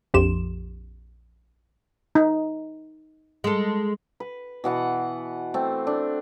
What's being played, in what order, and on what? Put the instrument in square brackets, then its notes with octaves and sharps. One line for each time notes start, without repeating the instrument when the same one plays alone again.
[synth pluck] A#1 F2 G4 C6 E7
[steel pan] D#4
[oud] G#3 A4
[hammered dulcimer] B4
B2 E3 F#5 A5
A3 C4 A4
A3 D4